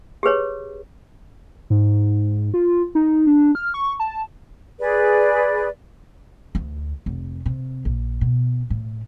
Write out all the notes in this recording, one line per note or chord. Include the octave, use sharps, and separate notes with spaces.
G4 G#4 B4 C#5
G#2
F4
D#4
D4
F6
C#6
A5
G#4 B4 D5
D2
F1
C3
A#1
B2
A2